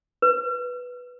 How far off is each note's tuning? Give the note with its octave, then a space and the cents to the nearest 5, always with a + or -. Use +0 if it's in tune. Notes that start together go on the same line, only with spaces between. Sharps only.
B4 +0